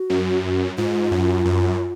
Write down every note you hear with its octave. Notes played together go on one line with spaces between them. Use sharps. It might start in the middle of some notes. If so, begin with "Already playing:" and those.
Already playing: F#4
F#2
G#2 F4
F#2
F#2